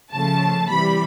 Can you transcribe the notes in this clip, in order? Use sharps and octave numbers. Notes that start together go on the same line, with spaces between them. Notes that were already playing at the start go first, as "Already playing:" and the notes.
C#3 F3 A3 A5
C3 E3 G3 B5